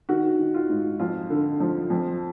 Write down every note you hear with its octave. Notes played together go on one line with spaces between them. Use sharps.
D#3 F#4
D#3
F4
G#2
F2 F4
D3
F3
F2